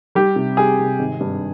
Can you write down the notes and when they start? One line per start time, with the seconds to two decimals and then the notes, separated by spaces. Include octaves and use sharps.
0.15 G3 G4
0.36 C3
0.57 G3 G#4
0.79 C3
0.99 G#1
1.20 G2